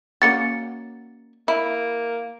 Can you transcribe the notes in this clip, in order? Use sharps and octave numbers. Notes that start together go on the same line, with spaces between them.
A#3 C#4 F#4 A6 C#7
A#3 E4